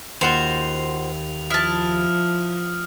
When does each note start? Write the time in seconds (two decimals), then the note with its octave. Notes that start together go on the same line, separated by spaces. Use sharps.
0.21 D#2 F4 F#4 C5 F7
1.50 F3 E4 A5 D#6 F6